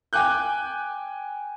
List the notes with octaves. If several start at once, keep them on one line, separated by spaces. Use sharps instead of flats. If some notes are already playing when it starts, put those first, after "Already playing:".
G5 G#5 D6 F#6 G6